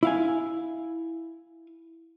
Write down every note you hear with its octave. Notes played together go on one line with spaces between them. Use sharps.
E4 F5 G#5